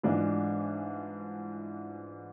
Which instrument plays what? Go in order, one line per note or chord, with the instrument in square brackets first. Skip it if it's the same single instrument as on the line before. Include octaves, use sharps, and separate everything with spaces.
[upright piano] G#2 E3 G#3 D4 F4